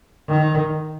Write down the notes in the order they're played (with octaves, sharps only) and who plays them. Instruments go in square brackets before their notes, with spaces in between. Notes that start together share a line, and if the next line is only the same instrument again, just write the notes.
[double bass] D#3